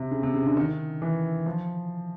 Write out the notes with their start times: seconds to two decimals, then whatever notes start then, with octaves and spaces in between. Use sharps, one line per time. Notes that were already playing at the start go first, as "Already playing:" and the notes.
Already playing: C3
0.11 C#3
0.23 C3
0.34 C#3
0.45 D3
0.57 D#3
1.02 E3
1.46 F3